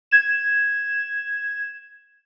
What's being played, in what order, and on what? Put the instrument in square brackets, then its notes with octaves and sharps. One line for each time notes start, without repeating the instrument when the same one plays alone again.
[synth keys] G#6 E7